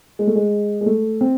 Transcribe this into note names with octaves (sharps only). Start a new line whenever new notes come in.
G#3
A3
G#3
G#3
A3
C4